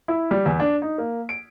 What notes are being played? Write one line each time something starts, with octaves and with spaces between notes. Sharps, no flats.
E4
G3
E2
D4
D#4
A#3
D7